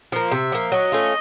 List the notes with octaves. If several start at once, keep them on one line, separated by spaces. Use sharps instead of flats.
F3 A#3
C3 E5
F3 A#3
F#3 D#5
A3 C#4 F4